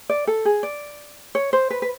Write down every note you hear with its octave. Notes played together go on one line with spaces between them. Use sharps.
D5
A4
G#4
D5
C#5
C5
B4
B4